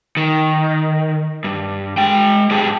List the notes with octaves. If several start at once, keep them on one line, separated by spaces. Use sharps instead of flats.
D#3
G2
G#3 G5
G#2 G#3 G4 G#4 G5 A5